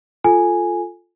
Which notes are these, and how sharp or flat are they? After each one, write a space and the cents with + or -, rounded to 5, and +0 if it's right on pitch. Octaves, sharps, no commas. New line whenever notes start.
F4 +0 A4 +0 G#5 +0